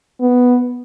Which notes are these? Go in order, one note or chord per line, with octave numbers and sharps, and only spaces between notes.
B3